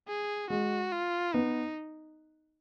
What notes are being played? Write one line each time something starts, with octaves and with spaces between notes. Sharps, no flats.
G#4
G#3 F#4
F4
B3 D#4